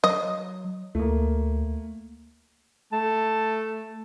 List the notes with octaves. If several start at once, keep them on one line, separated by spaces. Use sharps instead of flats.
F#3 D#5
D2 A3 A#3
A3 A5